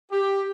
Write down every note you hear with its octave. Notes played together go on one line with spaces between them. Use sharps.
G4